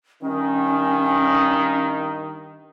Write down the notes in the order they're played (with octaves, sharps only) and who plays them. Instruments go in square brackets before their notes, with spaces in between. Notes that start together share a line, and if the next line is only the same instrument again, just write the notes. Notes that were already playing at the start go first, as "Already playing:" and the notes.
[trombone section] G2 D#3 [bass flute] C#4